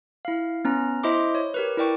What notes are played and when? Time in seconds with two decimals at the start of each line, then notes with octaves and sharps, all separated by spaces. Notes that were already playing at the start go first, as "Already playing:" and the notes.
0.25 E4 F5
0.65 B3 C#4 A#5
1.03 E4 C5 D#5 E5 C6 D6
1.35 C#5
1.54 G4 A#4 B4
1.77 E4 A#4 D5 G5 C#6